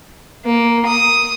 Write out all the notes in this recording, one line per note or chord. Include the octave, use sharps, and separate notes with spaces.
A#3
D#6